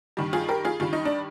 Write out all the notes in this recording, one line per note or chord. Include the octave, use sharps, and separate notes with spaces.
G2 D#3 G3
F4 G#4
G4 A#4
F4 G#4
G2 D#3 G3 F4
D#4
D4